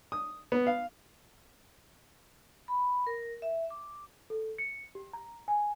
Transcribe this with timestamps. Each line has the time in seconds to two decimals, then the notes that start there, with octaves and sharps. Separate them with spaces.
0.12 D#6
0.52 B3
0.66 F5
2.68 B5
3.07 A#4
3.42 E5
3.70 D6
4.30 A4
4.58 C#7
4.95 G4
5.13 A#5
5.48 G#5